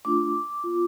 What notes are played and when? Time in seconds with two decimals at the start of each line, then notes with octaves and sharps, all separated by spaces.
0.05 A3 D4 F4 D6
0.64 B3 F4